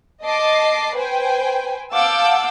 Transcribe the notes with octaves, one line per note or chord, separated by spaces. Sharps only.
D#5 A5 D6 C7
B4 C5 G5 G#5
F5 F#5 A5 D6 E6 G6